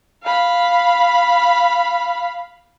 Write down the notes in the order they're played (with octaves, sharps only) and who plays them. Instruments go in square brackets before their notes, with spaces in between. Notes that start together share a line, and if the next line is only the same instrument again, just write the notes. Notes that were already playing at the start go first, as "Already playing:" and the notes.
[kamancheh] F5 B5